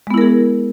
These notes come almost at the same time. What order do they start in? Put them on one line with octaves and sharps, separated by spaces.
G#3 B3 E4 A#4 G#4